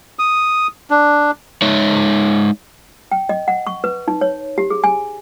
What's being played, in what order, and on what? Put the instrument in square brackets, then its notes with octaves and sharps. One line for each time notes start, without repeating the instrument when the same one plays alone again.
[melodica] D#6
D4
[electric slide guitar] G#3 D#4 C#5 E5
[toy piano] G5
D#5
F#5
C#6
B4
D#4
C#5
G4
G#4
G#5